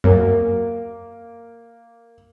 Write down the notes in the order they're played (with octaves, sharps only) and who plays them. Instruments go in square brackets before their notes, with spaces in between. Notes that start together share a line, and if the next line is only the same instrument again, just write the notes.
[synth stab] F#2 [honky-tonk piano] A#3